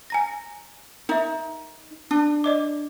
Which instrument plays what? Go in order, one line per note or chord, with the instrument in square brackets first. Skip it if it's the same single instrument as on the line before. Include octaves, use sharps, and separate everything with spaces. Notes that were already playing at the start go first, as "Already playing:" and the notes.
[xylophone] G#5 A#5 A#6
[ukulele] D#4 [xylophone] A#4 E5
[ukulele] D4
[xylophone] D5 D#5 D6